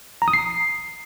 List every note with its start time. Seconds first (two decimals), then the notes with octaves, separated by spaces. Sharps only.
0.22 A#5
0.28 D#6
0.33 C7